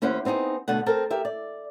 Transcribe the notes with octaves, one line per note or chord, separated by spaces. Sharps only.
D#2 C#4 E4 C5 F#5
B3 C4 D#4 G4 G#4
B2 D3 A3 F#5
C4 A4 A#4
G4 A#4 E5
D5